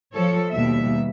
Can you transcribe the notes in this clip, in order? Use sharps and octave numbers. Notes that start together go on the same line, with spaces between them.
F3 A4 C#5
D#2 B2 G3 E5